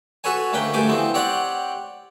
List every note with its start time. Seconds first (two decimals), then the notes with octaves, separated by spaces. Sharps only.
0.24 F#4 A4 B4 C#5 G#5
0.53 D2 A#3 C#4 B4 G5
0.74 D2 G2 A3 G4 G#5 D6
0.88 E3 F3 B3 C4
1.14 C4 G4 C#5 D5 F#5